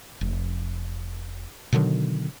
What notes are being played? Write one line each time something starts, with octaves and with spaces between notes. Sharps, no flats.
F1
B2 D3 D#3 F#3